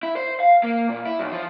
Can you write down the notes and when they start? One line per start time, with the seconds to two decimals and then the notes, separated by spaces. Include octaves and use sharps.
0.03 E4
0.17 C5
0.40 F5
0.63 A#3
0.89 A#2
1.05 E4
1.19 B1
1.32 F3